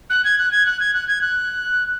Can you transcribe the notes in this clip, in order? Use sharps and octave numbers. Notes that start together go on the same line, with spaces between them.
F#6
G#6
F#6
G#6
F#6
G#6
F#6
G#6
F#6